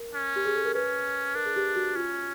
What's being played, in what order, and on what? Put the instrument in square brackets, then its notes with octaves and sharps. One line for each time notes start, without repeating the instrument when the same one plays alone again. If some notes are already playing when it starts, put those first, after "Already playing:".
Already playing: [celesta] A#4
[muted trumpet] C#4
[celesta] G4
G#4
A4
A#4
[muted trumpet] C#4 [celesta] B4
[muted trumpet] D4 [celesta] A#4
[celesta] G#4
G4
F#4
[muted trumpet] C#4 [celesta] F4